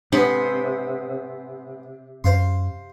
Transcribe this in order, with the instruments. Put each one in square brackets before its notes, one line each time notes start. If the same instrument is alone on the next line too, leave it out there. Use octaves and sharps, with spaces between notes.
[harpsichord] G#2 B3 [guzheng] C3 [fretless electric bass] D4
[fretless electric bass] F#2 [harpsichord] C5 F5 C6